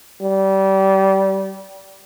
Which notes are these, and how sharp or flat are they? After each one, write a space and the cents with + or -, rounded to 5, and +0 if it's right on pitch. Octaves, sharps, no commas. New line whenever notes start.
G3 -25